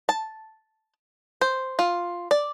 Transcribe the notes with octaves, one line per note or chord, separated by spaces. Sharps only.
A5
C5
F4
D5